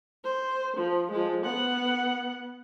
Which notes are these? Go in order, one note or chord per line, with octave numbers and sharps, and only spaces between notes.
C5
F3
F3 G#3
B3 F#5